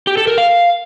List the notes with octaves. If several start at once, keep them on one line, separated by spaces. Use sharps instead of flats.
G4
A4
A#4
F5